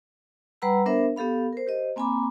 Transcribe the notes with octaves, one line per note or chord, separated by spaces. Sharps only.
G3 B4 F#5 A#5 B5 E6
B3 D4 A#4 C5 E5
B3 G4 A4 F5 B5
A#4 C5
G4 C5 D#5
A#3 C4 G#5 A#5 B5 D6